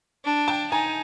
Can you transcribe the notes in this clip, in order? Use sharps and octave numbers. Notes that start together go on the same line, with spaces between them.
D4
G5 A5
D#4 G#5 A#5